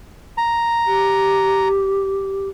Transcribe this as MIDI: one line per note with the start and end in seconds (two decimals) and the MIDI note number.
0.38 1.68 82
0.87 2.49 67